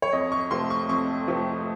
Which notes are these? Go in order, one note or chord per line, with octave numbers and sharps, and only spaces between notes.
C#5
F2 D#5
C#6
C3 F3 A3 C4 C6
C#6
F2 C#6
C3 F3 A3 C4